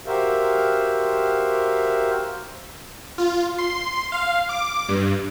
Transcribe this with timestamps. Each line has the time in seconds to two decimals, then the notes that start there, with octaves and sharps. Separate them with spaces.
0.06 F#4 G4 A#4 C5 E5 F5
3.18 F4
3.58 C6
4.12 F5
4.49 D6
4.89 G2